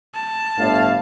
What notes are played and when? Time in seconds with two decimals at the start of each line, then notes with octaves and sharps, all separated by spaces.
0.15 A5
0.58 G1 A2 F5